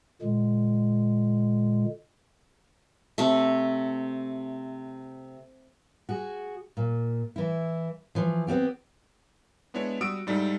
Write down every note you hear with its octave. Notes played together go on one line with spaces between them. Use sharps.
A#2 D3 G#3
C3 A3
F#4 G#4
A#2
E3 E4
E3 F3
B3 C4 F4 G4
G#3 B3 D4 E4 C#5
G3 F#4 D#6 E6 D7
G#2 G3 D#4 E4 A4